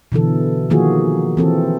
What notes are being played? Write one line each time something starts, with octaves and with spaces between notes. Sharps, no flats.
B2 D3 E3 A4
D#3 F3 A#3 F4 F#4 G#4
E3 C4 A4